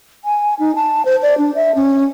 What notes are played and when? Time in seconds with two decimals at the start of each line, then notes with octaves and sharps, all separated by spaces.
0.25 G#5
0.59 D#4
0.76 A5
1.05 C5
1.23 D5
1.38 D4
1.55 E5
1.75 C#4